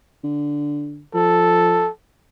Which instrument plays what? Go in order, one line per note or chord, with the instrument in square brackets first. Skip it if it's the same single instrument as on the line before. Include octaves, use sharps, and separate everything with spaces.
[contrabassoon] D3
[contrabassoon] F3 [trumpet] A4